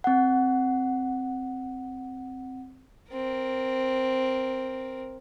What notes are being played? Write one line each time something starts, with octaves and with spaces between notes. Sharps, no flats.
C4 F#5
C4 A#4